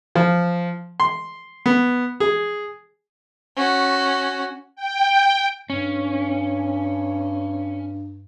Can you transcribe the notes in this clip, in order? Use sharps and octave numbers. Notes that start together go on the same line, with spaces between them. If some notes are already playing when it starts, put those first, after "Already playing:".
F3
C6
B3
G#4
C#4 F#4
G5
G2 C#4